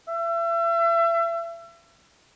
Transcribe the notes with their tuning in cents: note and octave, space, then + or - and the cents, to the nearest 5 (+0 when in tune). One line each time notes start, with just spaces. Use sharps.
E5 +35